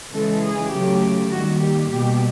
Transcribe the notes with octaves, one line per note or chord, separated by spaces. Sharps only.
C#3 E3 G#3 A4
G#4
C#3 F#3 A3 G4
D#3 G3 A#3 F#4
G4
B2 G3 A#3 G4